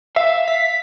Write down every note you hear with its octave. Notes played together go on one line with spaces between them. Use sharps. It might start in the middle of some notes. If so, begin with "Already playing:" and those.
E5 F5
B6